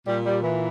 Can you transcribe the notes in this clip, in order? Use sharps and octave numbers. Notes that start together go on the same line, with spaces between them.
A#2 G3
G3
E3